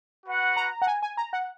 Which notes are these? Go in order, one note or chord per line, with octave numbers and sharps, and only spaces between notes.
F#4 B4 F#5
A#5
F#5
G#5
G#5
A#5
F#5